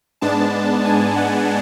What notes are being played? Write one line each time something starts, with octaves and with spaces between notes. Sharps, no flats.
G#2 G#3 B3 D4 A5
G#5
F#5